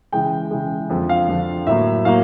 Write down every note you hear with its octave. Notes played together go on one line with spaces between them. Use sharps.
C#3 E3 G#3 G5
C#3 E3 G#3
F2 D3 F3
F5
F2 D3 F3
A2 F#3 A#3 E5
A2 F#3 A#3 F5